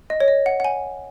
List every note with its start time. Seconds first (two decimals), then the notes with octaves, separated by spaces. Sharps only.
0.10 D#5
0.20 C#5
0.28 D#5
0.46 F#5
0.60 F#5
0.64 G#5